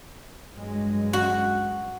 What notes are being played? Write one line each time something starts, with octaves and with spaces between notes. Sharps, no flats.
G2 F#3 G#3
F#4